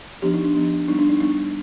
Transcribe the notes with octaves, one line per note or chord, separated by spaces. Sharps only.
F3 B3 D4 G4
D#4
D4
F3 B3 D4
G3 B3 D4 D#4
D4
D#4
G3 B3 D4 D#4